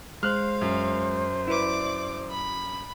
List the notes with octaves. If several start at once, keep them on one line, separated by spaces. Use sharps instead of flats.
G#3 C5 F5 F6 F#6
F#2
E4 B4 D5 D6
B5